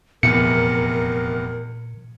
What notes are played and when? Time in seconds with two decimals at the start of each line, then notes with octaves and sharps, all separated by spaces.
0.23 F1 E2 A#2 A#4 C#7